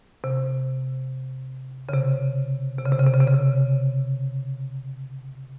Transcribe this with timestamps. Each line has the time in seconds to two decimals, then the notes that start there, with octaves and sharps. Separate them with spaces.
0.24 C3
1.89 C#3
1.93 C3
2.78 C3
2.85 C#3
2.92 C3
2.99 C#3
3.07 C3
3.13 C#3
3.21 C3
3.27 C#3
3.34 C3